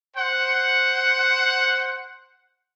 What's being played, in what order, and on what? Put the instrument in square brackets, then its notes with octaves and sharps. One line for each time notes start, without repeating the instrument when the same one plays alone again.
[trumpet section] C5 F#5